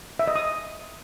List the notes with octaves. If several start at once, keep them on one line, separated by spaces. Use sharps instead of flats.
E5
D#5
D#6